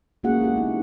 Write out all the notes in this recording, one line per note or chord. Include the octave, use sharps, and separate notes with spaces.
G#3 A#3 C#4 F#4 G#4 F#5
C#4 E4 G4
B3 D#4